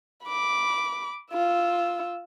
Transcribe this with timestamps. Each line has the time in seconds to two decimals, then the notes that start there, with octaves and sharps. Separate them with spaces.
0.25 B5 D6
1.33 F4 E6